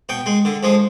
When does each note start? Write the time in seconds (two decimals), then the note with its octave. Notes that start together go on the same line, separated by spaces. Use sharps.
0.09 B2 G5
0.26 G#3
0.45 D3
0.63 F3 G#3